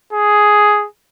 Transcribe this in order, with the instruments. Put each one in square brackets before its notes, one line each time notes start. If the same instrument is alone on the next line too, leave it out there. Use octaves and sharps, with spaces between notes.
[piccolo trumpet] G#4